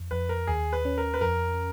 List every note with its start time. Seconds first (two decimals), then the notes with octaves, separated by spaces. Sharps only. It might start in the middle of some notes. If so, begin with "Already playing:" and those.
Already playing: F2
0.11 F2 B4
0.29 A#4
0.47 D#2 G#4
0.73 B4
0.85 C#4
0.98 A#4
1.14 B4
1.21 F2 A#4